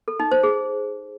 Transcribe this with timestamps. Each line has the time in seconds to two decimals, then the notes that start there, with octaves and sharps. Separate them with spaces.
0.08 A4
0.20 D#4
0.31 C5
0.43 G#4